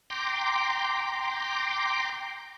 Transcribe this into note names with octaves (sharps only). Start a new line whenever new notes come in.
G5 A#5 C6 D6